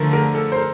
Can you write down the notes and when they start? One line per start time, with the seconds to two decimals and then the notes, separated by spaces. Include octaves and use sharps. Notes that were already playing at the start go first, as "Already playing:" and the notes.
Already playing: D3 F3 A3 A#4
0.13 A#4
0.35 A4
0.52 C5
0.56 A#4